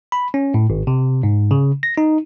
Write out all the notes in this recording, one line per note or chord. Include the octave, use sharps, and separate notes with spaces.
B5
C#4
A2
G#1
C3
G#2
C#3
A#6
D#4